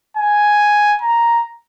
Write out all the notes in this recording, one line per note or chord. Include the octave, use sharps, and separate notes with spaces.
G#5
A#5